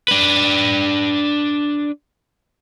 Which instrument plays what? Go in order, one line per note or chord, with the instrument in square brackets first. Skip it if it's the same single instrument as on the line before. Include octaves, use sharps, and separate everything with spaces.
[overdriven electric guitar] D4 B4